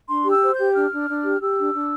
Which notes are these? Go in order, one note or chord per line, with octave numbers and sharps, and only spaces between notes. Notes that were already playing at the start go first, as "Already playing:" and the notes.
D4 C6
G4
E6
C5
G6
G4
D4 F6
D4
D4
G4
G4 E6
D4
D4